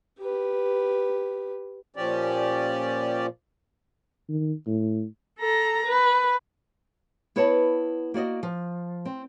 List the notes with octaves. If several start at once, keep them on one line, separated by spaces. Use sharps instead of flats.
G4 B4
A#2 F3 C#4 G4 D5
D#3
A2
A4 A#5
B4
B3 E4 B4 C#5 D#5 A5
A#3 F#4 D5 D#5
F3
C4